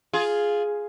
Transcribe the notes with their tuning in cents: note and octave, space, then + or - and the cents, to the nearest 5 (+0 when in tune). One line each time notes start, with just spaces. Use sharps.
F4 +0 G#4 +5